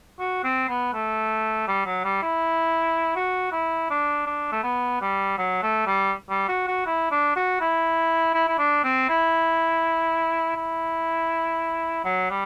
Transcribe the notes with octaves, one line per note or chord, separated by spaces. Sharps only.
F#4
C4
B3
A3
G3
F#3
G3
E4
F#4
E4
D4
D4
A3
B3
G3
F#3
A3
G3
G3
F#4
F#4
E4
D4
F#4
E4
E4
E4
D4
C4
E4
E4
F#3
G3